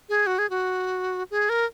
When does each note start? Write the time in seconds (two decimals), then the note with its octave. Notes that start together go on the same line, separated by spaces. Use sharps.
0.09 G#4
0.26 F#4
0.38 G#4
0.50 F#4
1.31 G#4
1.49 A#4